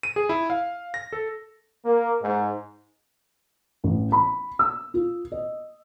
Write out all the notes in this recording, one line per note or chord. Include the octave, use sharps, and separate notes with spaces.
D#7
G#4
E4
F5
A#6
A4
A#3
G#2
A1
B5
E6
F4
D#5